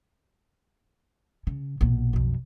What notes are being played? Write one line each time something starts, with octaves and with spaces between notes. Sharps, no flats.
C#3
A#1 B2
B1 F2